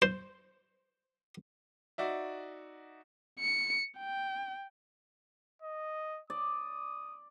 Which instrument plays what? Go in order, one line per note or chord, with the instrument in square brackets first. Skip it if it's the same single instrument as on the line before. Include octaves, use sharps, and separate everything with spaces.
[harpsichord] C5
[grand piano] D#4 F#4 D5 E5
[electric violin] C#7
G5
[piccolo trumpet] D#5
[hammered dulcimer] D5 [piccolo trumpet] D#6